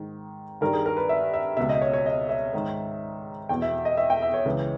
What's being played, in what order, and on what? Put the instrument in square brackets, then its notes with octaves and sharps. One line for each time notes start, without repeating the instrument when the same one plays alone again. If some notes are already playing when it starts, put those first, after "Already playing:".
Already playing: [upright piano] G#2 D#3
G2 D#3 A#4
G#4
A#4
B4
E5
E5
C#2 B2 E5
D#5
C#5
C#5
D#5
E5
G#2 D#3
E2 B2 G5
E5
D#5
E5
G5
E5
C#5
C#2 C#3 E3